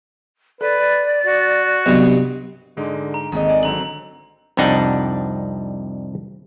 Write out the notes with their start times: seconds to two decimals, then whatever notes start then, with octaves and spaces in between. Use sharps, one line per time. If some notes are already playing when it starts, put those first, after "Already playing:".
0.61 A4 B4 D5
1.26 F#4
1.86 C2 G2 B2 F#3 B3
2.77 G#2 D3 G#3 D#4
3.14 A#5
3.32 G#1 D#2 G#3 A3 D#5
3.49 D5 G#5
3.63 D3 F#3 C4 A#5 F#7
4.57 C2 F2 G3 D4 D#4 F#5